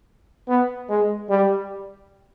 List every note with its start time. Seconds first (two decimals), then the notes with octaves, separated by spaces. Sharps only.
0.48 B3
0.90 G#3
1.30 G3